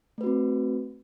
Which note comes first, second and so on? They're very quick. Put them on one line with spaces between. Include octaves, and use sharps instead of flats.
A3 B4 F#4 C4